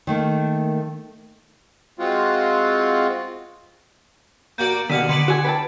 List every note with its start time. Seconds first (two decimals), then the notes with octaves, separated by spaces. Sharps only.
0.07 D#3 A3 A#3
1.99 G#3 C4 F4 F#4
4.58 A#3 F#4 D5 G6
4.89 D#2 B2 D3 F5 F#5 B6
5.09 D3 B4 D5 C#7 F#7
5.28 D4 F#4 G#5
5.45 B4 G5 A5